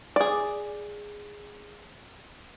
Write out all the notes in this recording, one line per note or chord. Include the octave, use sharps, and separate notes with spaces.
G#4 D5